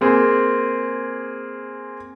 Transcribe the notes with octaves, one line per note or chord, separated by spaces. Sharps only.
A#3 C4 G#4